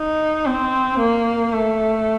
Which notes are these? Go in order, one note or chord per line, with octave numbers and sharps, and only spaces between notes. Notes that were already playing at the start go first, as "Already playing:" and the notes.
Already playing: D#4
C4
A#3
A3